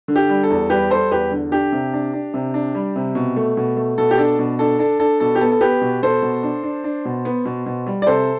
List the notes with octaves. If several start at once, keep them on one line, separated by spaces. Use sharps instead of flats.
D3
G4
G3
A4
E2
G3 G4 B4
G3 A4 C5
E2 G4 B4
D3
D4 G4
C3
D4
D4
C3
D4
G3
C3
B2
A3
B2
A3
B2 A4
G4
D4 A4
B2
D4 A4
D4 A4
D4 A4
B2 A4
G4
B3 A4
A4
B3 G4 B4
B2
B2 A4 C5
B2
D4
D4
D4
B2
B3
B2
B2
G3
D5
C3 A4 C5